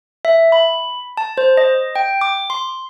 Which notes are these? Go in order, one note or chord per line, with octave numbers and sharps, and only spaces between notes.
E5
B5
A5
C5
D#5
G5
D6
C6